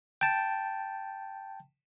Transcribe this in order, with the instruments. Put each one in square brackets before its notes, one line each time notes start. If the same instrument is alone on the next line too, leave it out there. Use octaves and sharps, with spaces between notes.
[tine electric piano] G5 A5